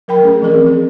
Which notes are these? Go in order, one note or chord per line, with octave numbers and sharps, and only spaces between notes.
F#3 A#4 G5 B5
A3 C#4 G#4
E3 F3 C4 G#4 A#4
G#4